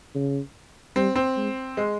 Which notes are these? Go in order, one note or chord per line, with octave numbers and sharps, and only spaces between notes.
C#3
G3 C4
C4
G#3
G#3